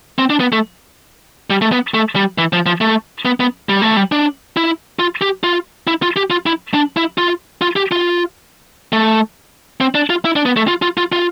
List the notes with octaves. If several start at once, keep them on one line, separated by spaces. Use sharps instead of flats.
C4
D4
B3
A3
G3
A3
B3
A3
G3
E3
F3
F3
A3
B3
B3
G3
A3
G3
D4
E4
F4
G4
F4
E4
F4
G4
F4
E4
D4
E4
F4
F4
G4
F4
A3
C4
D4
F4
E4
D4
B3
A3
F4
F4
F4
F4